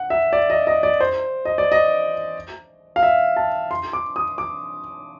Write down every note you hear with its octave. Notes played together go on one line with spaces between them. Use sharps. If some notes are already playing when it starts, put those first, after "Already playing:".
Already playing: F#5
E5
D5
D#5
D#5
D5
C5
D#5
D5
D#5
F5
E5
A5
C6
D6
D#6
D6